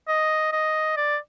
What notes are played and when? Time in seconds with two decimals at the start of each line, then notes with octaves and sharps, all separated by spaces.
0.08 D#5
0.52 D#5
0.96 D5